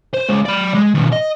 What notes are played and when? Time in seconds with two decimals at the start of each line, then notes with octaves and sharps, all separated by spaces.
0.14 C5
0.29 G#3 C#4
0.46 D5 B5
0.75 G#3
0.95 D#2 B2
1.13 D#5